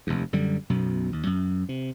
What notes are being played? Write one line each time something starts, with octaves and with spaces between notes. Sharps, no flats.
F1 D#2
F#2 D3 G3
B1 F#2 B2
D#2
F#2
C3